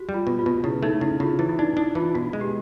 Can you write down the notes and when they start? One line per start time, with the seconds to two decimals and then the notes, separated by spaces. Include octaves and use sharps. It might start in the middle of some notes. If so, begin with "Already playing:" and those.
Already playing: F#4 G4
0.09 G3
0.14 F4
0.27 B2
0.39 F4
0.46 B2
0.64 C#3 E4
0.83 A3 D#4
1.01 C#3 E4
1.20 C#3 F4
1.39 E3 E4
1.49 E4
1.59 D4 D#4
1.77 D4 E4
1.95 E3 F4
2.15 B2 F#4
2.33 G#3
2.41 G4